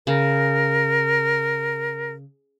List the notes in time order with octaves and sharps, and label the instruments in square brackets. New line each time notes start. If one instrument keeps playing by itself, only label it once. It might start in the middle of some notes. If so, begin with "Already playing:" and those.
[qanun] C#3 [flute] A#4